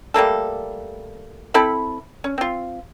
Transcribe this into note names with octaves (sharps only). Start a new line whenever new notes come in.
G3 A3 A#3 A4
C4 E4 A4 B5
C#4
C4 F4